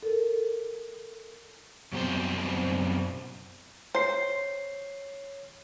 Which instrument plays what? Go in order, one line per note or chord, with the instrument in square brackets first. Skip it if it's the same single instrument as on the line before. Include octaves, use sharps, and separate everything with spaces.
[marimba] A4 A#4
[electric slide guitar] F#2 B2 G3 C4 C5
[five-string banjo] C5 [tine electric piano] C#5 C7